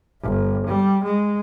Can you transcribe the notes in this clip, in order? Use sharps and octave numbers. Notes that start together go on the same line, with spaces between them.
G1
G3
G#3